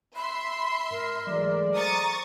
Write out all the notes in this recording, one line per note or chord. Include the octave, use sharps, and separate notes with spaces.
E5 B5 C6
G#2 A#4
E3 F#3 G#3 A3 D5
C5 A#5 C#6 D#6 A6